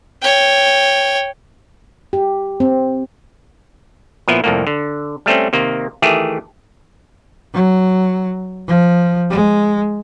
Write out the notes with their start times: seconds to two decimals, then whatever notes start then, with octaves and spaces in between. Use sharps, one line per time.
0.22 C#5 G5
2.13 G4
2.60 C4
4.28 A#2 F3 B3 E4
4.44 C2 F2 A2 A#3
4.67 D3
5.26 G3 A3 C4 C#4
5.53 C3 D#3 A#3
6.02 D#3 E3 A3 G4 G#4
7.54 F#3
8.68 F3
9.31 G#3